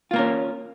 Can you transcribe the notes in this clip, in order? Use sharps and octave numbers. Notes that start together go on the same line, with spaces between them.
A#3 C#4 F4 A#4